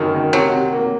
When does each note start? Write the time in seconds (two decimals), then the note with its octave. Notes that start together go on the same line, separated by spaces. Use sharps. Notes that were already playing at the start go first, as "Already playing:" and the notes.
Already playing: F#2 D#3
0.14 D#3
0.33 C3 F#3
0.53 C3
0.72 A#3